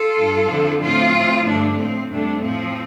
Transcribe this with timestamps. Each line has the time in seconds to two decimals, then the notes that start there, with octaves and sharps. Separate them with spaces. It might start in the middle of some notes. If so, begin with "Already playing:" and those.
Already playing: F4 A4
0.18 G2 G3
0.50 F2 D3 F3
0.82 A2 F3 C4 F4
1.14 A2 F3
1.46 G2 D3 F3 A3 D4
1.79 A2 F3 C4
2.11 F2 C3 G3 A3 D4
2.43 A2 F3 C4